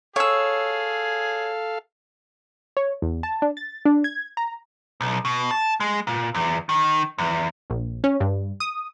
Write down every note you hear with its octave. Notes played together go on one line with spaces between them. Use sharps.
G#4 A4 C#5 F5 E6
C#5
E2
A5
D4
A6
D4
G#6
A#5
B1
B2
A5
G#3
A#2
E2
D#3
E2
A#1
C#4
G2
D#6